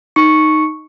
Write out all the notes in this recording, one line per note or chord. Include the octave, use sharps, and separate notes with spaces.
D#4 C#6 C#7